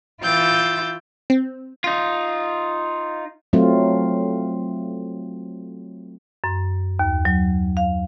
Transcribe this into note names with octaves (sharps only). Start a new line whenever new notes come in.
E3 F4 G5 E6 G6 A6
C4
D#4 F4
F#3 A3 C4 F4
F#2
D#2
F#3
F5